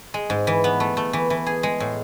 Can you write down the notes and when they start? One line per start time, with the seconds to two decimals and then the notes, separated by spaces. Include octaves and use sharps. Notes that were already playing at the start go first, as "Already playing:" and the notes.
0.14 G#3
0.30 G#2
0.47 E3
0.64 B3
0.80 A3
0.97 A3
1.13 E3
1.30 E3
1.47 G#4
1.63 G#3
1.80 A2